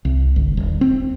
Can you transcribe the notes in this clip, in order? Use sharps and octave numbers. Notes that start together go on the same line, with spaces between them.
C2
G1
D#1
C4